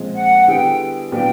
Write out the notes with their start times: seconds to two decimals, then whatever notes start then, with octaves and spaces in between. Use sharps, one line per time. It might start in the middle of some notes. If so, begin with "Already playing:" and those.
Already playing: A#2 F3 G#3 C4
0.15 F#5
0.48 D3 G3 B3 E4 G#4 G5
1.11 A#2 F#3 B3 D4 F4 G5